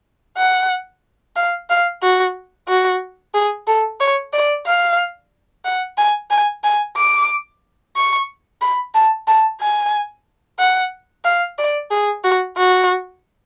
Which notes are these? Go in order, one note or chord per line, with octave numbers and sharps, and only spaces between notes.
F#5
F5
F5
F#4
F#4
G#4
A4
C#5
D5
F5
F#5
G#5
G#5
G#5
D6
C#6
B5
A5
A5
G#5
F#5
F5
D5
G#4
F#4
F#4